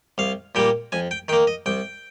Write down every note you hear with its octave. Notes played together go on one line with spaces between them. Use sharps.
C2 F5
A#2 G3 A#3 G5
F2 G#5
G5
D#3 A#3 G5
D#5
C2 G5